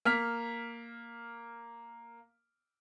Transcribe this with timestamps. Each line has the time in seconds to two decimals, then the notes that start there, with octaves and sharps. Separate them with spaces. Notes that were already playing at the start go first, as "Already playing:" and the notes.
0.05 A#3 F6 B6